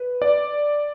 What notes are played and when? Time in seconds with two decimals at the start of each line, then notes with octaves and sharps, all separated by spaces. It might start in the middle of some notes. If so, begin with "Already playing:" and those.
Already playing: B4
0.22 D5